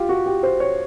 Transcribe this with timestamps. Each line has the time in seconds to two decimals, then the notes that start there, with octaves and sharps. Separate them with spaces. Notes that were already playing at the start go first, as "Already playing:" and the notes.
Already playing: F4 G4
0.09 F#4
0.26 G4
0.43 C5
0.60 C#5